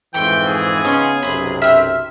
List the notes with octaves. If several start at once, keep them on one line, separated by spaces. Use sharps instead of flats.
F2 G#2 E3 G5 C6 C#6
G#4
C#3 B3 C#4 D#4 C6 D#6
B1 F#2 C3 B5 C6
C4 E5 F6